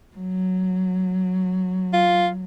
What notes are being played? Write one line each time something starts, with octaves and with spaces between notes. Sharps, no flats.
F#3
F4